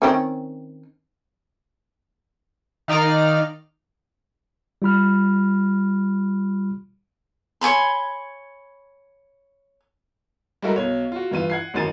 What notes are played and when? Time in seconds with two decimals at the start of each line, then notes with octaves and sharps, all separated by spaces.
0.02 D#3 C4 C#4
2.88 D#3 D#4 D5 F5 F6
4.82 G3 F4 B5 F6
7.61 C#5 G#5 B5 C6
10.62 G3 G#3 E4 F#4 A4 A#4
10.76 B1 C#5
11.12 F4 F#4
11.31 G2 E3 F4 D#7
11.50 F#5 G#6 C7
11.74 A1 F#2 D#3 A6 D#7